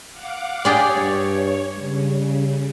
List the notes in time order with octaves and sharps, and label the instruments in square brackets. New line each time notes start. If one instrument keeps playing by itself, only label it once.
[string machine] F5 F#5 D6
[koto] G4 G#4 D5 [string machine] C#5
[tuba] G2
[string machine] C#3 [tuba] G3